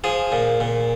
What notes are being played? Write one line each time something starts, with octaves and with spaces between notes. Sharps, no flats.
F3 G#4
A#2
A#2